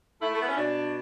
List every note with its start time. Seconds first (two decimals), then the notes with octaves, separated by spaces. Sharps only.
0.22 A3 E4
0.34 A3
0.42 B3
0.49 C#4
0.56 B2 D4